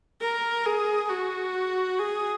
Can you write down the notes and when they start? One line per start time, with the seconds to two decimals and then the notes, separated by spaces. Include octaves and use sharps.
0.21 A#4
0.66 G#4
1.10 F#4
1.99 G#4